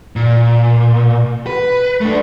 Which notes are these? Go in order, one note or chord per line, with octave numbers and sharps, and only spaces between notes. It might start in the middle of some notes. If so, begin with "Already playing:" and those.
A#2
B4
A3 D4